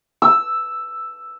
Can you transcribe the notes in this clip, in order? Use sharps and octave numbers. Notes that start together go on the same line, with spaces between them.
E6